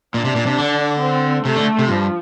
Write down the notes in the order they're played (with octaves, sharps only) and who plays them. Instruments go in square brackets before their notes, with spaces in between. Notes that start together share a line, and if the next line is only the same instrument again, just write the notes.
[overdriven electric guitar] A#2 [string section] D4
[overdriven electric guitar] C3
A#2
C3
D3
[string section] C4
[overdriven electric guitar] C3 [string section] A3
[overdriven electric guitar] D3
C3
[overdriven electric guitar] G2 [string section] F3